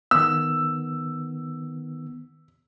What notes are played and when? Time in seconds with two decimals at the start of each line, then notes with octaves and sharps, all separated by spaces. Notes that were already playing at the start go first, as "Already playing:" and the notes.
0.11 D#3 B3 E6